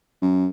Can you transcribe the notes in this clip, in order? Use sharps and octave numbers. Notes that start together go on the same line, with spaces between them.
F#2